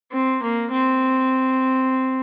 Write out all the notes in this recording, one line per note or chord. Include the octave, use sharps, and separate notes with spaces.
C4
A#3
C4